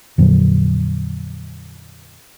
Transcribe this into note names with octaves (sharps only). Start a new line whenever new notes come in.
F2 A#2 D3 F#3